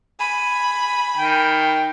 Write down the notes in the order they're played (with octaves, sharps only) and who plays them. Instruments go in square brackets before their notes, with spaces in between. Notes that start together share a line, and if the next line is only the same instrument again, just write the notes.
[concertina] G#5 [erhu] B5
[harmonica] D#3 G5